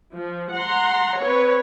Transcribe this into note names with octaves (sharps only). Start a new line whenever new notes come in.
F3
F#5 A#5 C6
C4 B4 C#5